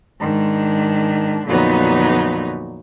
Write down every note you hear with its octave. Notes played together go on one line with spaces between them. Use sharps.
G#2 D#3 D4
F2 A#2 D3 F#3 B3 D#4